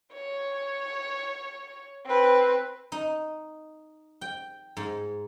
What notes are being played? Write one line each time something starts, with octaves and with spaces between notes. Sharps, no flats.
C#5
C4 B4
D#4
G5
G#2